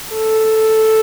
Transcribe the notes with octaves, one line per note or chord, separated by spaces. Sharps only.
A4